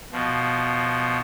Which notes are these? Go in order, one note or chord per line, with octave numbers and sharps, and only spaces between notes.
B2 F3